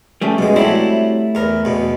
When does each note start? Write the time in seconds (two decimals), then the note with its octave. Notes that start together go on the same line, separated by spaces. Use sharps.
0.21 G3 A3 C#4
0.38 F#2 B2 G#3
0.56 F#3 G3 A3 C4 E4
1.35 E2 A#4
1.65 E2 B2